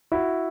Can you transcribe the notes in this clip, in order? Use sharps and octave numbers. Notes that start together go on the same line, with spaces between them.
E4 F#4